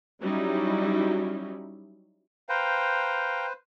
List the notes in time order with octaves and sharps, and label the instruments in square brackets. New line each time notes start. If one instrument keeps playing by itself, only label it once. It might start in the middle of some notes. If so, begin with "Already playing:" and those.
[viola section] F#3 G3 C#4 D#4 E4
[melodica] B4 C5 [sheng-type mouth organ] F5 G5 A#5